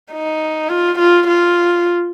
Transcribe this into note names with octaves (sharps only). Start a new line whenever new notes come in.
D#4
F4
F4
F4